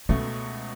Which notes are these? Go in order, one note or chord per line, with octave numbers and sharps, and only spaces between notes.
C#2 B2 A3 C#4